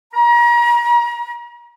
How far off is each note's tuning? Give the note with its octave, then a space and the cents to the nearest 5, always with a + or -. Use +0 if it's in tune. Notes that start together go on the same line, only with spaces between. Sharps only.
A#5 +35